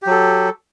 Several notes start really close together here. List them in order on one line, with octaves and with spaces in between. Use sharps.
G4 F#3 A4